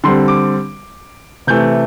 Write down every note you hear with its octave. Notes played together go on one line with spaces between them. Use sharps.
D3 G3 C4 C6
D6
C3 E3 A3 G6